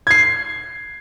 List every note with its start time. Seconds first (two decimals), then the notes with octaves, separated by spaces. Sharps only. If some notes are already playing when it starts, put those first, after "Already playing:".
0.07 G#6 C7